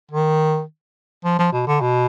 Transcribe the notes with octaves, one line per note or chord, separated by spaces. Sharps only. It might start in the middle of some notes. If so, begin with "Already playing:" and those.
D#3
F3
F3
B2
D3
B2